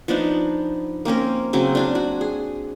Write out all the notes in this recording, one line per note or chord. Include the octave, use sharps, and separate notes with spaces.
F3 B3 D4 D#4
A#3 C4 C#4 A#4
C#3 F#3 C4
D4 F#4 G#5
F#4
G#4